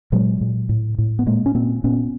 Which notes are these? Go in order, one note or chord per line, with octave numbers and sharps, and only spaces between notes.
A#2 F#3 G#3
A#2
A2
A2
B3
A#2 G#3 A#3
C#4
A#2 A#3 C4
A#2 B3 C#4